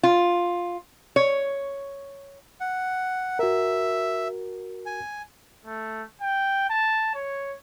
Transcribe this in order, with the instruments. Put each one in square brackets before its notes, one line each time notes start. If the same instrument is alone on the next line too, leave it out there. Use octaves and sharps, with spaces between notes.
[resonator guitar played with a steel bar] F4
C#5
[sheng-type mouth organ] F#5
[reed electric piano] F#4 A#4 [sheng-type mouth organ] E5
[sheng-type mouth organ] G#5
[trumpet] A3
G5
A5
C#5